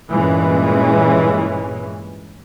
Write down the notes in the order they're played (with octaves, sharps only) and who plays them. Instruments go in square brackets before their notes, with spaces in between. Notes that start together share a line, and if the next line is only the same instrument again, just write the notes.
[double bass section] G2 A#2 E3 G#3 C#4